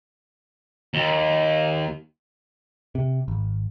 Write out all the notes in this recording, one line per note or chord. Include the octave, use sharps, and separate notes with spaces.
D#2
C3
G#1